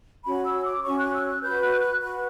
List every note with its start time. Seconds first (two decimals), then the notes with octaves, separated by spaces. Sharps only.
0.25 C#4 F#4 C#5 B5
0.44 E6
0.64 D6
0.83 C#4 F#4 C#5 C#6
0.98 F#6
1.13 E6
1.27 F#6
1.42 F#4 B4 G6
1.61 F#6
1.81 F#6
2.01 F#4 B4 F#6